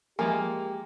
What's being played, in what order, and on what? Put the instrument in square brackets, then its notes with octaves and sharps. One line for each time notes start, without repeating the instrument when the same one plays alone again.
[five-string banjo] E3 F3 G#3 [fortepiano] A#3 [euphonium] G4 [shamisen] G#5